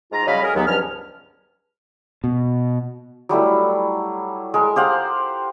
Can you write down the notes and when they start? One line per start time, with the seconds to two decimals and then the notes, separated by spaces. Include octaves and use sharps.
0.12 G#2 F4 A#5
0.27 C#3 F#3 G3 D#5 F5 B5
0.43 G#4 A#4
0.55 D#2 F#3 B3
0.67 C#2 G2 F3 C#4 F6
2.24 B2
3.29 F#3 G3 A3 E4
4.54 G#3 A#4
4.76 G4 C5 F5 F#5